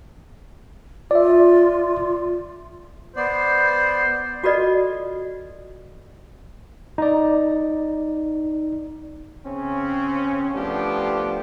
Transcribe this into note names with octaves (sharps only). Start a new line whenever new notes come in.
F4 D5 E5
B3 C5 D5
F4 F#4 A4 B4 D5 D#5
D#4 D5
C#3 C4 C#4
F3 A3 B3 D4 G4